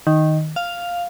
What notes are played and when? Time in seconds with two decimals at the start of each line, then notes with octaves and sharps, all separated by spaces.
0.07 D#3
0.56 F5